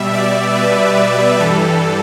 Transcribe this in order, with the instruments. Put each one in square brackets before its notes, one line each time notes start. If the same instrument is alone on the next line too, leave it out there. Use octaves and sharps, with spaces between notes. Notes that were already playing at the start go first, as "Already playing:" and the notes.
Already playing: [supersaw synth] B2 G3 E5
D5
B4
G2 E3 G3 A4